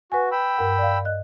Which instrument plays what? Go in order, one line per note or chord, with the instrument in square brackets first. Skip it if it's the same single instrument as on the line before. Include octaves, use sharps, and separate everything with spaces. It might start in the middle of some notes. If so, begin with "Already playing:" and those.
[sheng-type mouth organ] F#4 [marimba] B4 G#5
[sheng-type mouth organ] G5 B5 E6
[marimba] G2 A#4 F#5
D5 F5
D#5 F#6